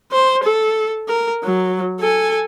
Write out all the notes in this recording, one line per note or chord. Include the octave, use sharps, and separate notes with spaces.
C5
A4
A#4
F#3
A4 G#5